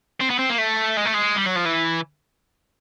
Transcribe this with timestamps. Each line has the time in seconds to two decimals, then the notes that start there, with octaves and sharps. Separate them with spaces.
0.20 C4
0.30 B3
0.39 C4
0.49 A#3
0.58 A3
0.97 G#3
1.06 A3
1.15 G#3
1.36 G3
1.46 F#3
1.56 F3
1.66 E3